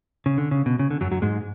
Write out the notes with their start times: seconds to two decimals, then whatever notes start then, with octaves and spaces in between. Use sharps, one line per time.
0.26 C#3
0.38 D3
0.51 C#3
0.66 B2
0.79 C#3
0.91 D3
1.01 F#2 F#3
1.11 F#2 F#3
1.22 G#2 G#3